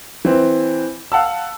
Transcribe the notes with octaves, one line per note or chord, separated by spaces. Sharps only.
E3 C4
F5 F#5 A5 E6